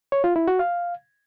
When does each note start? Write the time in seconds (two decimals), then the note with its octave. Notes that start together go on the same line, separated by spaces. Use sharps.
0.12 C#5
0.24 F4
0.36 E4
0.48 F#4
0.59 F5